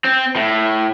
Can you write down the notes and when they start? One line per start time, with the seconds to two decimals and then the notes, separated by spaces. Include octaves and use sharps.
0.04 C4
0.36 A2